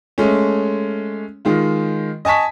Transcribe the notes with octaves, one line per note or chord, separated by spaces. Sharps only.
G#3 A3 C#4
D#3 G#3 F4
D#5 G#5 A5 C#6 B6